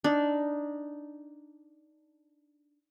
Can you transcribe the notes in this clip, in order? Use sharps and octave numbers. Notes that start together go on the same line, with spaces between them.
D4 D#4